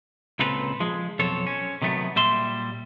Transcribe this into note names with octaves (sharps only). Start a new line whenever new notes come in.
C#2 A#2 C4 A4 B4 A#5
F3 G#3
B1 F2 C4 A4 C#5
C#4
C3 D#3 F#3 A3 B3
A#2 G3 E5 C6